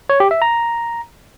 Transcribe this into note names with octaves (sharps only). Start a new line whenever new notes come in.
C#5
G4
E5
A#5